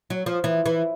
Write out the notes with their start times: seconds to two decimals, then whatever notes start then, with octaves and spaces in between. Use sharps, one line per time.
0.10 F#3
0.26 F3
0.44 E3
0.66 E3